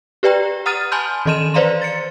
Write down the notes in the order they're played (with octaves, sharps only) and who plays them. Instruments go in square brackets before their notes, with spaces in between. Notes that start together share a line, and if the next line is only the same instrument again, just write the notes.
[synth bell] G4 B4 D5 G5 A#5
F#5 A#5 D#6 F6 A6 D#7
G#5 A5 B5 C6 F6 G6
D#3 E3 D#5 C6 D#7 E7
B4 C5 D5 F5 A#5 C6
A6 C#7